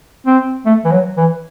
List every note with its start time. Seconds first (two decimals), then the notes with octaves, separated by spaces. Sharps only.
0.26 C4
0.66 A3
0.85 E3
0.92 F#3
1.17 E3